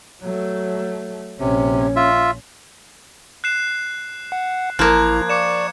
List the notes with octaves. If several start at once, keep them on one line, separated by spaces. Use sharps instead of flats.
F#3 A3
A#1 C3 C#4
F4 E5
F#6 C7 E7
F#5
A1 F3 A#3 E4 A#5 F#6 G#6
D5 C#6 D6 C#7 E7